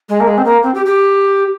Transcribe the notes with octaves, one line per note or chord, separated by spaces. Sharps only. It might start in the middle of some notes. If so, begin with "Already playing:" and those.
G#3
A#3
G#3
C4
A#3
C4
G4
G4